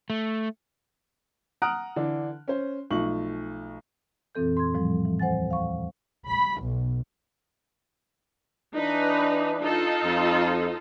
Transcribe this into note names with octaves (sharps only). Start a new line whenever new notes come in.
A3
F#5 A#5 D#6 F6 F#6 D7
D3 E3 D4
C#4 C5
B1 F3 A3 C#6 F#7
F2 A#2 E3 C4 A4 G6
C6 G#6
A2 F3 G3
E3
D#2 C5 F#5 G#5 A6
F5 C#6
B5
B1
E3 D4 D#4 B4
D#4 F4 A4
F2